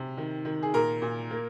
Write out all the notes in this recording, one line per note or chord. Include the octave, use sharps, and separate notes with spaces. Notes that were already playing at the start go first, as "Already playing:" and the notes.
Already playing: C3
D#3
D#3
G#4
A#2 A#4
A#2
A#3